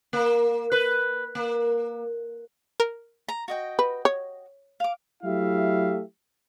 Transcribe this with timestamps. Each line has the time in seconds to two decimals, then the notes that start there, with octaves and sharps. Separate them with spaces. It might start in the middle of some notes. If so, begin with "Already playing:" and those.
0.13 A#3
0.72 B4
1.35 A#3
2.80 A#4
3.28 A#5
3.48 F#4 D#5 G5
3.79 B4
4.05 C#5
4.80 F5 D6
5.23 F#3 A3 E4 G4 E5 F5